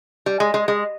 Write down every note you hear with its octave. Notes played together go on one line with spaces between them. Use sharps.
G3
G#3
G#3
G#3